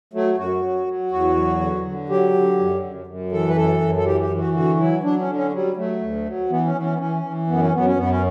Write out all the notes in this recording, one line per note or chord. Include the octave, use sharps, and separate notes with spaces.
F#3 A3
F#2 F#4
F#3
F#3
E2 F#4
F#3
D3
D3
F#3 G4
D3
F#2
F#2
F#2
E3 A4
B4
F#2 A4
F#2
A4
E3 G4
G4
E3
F#4
D3 F#4
F#3 E4
F#3 D4
C#4
D3
C#4
F#3 G3
F#3 A3
D2
F#3
E3 B3
C#4
E3
C#4
B3
E3 C#4
E3
F#2 B3
C#4
F#2 B3
C#4
F#2 B3
C#4